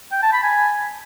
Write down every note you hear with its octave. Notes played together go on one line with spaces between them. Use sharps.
G5
A5
B5
G#5